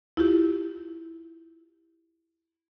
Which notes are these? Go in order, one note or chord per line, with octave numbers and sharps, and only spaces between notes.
E4 F4 G4